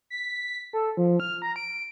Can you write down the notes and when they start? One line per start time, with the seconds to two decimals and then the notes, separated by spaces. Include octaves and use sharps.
0.10 B6
0.73 A4
0.97 F3
1.20 F6
1.42 A#5
1.56 D7